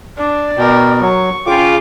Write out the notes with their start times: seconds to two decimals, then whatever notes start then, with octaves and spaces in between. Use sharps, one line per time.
0.17 D4 D5
0.57 B2 A#4 G5
1.01 F#3 C#6
1.46 C#3 F4 G5 D6